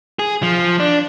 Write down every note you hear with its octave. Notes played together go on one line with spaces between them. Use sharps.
G#4
F3
D4